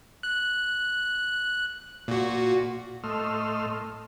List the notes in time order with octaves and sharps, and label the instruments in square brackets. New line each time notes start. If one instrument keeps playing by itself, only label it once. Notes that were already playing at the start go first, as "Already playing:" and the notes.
[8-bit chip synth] F#6
A#2 F#4
[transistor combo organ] A2 A3 D#5 C6 E6 F6